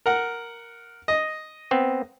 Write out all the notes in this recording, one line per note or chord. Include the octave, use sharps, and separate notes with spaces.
A#4 F#5
D#5
B3 C4